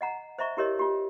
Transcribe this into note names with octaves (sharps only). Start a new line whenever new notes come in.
D#5 F#5 A#5
C5 D#5 E5 A#5 C#6
E4 G4 A#4 C#5 D#5
F4 G4